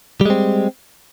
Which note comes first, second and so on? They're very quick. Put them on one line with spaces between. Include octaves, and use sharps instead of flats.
G3 G#3 C4